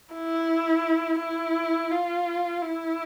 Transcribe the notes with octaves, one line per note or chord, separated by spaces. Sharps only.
E4
E4
F4
E4